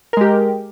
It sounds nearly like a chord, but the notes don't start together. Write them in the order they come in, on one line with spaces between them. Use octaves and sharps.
A#4 G#3 G4